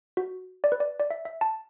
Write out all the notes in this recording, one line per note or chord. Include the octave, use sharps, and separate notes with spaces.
F#4
D5
B4
D5
D5
E5
E5
A5